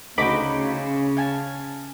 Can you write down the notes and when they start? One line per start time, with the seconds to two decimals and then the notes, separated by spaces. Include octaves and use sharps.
0.18 D2 C#3 D#4 F#4 C5 B5 D6
1.17 F5 G#5 A5